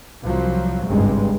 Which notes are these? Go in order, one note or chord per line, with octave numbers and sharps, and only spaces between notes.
C2 F3 F#3
G#1 C#2 G2 G#3